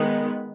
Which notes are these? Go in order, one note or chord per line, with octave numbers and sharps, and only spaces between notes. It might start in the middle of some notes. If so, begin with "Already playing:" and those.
Already playing: D#3 G#3 B3